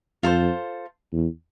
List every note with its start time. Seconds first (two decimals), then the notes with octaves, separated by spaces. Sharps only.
0.23 F2 F4 A4 C5
1.12 E2